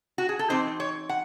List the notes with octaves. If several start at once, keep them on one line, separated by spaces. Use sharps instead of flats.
F#4
G#4
A4
E3 C4 D#4 C5
C#5
F#5